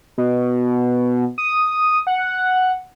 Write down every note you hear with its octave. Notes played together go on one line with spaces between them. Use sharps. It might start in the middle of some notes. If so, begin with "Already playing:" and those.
B2
D#6
F#5